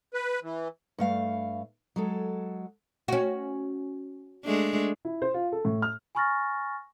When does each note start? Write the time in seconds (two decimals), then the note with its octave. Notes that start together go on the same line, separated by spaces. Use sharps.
0.14 B4
0.43 E3
0.99 G2 A3 F5
1.96 F#3 G#3 A4
3.08 C#4 F#4
4.45 G#3 A3 D4
5.05 E4
5.22 C5
5.34 F4
5.52 A4
5.65 A2
5.82 F6
6.15 G#5 B5 C#6 F6 A6 A#6